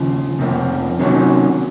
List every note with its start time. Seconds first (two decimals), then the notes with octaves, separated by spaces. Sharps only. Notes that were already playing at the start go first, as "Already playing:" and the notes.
Already playing: D#2 C#3 F3
0.39 F2 C3 F3 A#3
0.99 C3 D#3 F#3 A#3 C#4